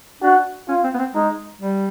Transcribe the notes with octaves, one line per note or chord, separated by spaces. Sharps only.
D4 F#4
C#4 F4
C4
B3
C4
G#3 D#4
G3